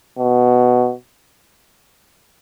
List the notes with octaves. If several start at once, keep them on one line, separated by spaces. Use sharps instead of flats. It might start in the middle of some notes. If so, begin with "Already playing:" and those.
B2